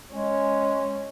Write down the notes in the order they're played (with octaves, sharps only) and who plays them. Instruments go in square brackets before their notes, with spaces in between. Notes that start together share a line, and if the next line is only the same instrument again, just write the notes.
[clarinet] G#3 [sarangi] C#4